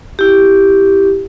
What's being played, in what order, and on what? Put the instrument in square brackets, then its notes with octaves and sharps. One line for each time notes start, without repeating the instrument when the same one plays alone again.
[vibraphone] E4 G4